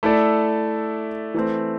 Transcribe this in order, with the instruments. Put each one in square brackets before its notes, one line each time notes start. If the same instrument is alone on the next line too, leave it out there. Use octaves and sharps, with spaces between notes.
[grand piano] A3 E4 A4 D5
E3 A3 C4